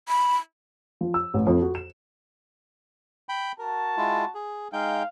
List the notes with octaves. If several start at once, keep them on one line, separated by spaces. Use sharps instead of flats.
B5
F3
E6
A1
F2
F#4
E7
G5 B5
F#4 A#4 A5
G#3 E4 F4
G#4
G#3 D#4 F5 G5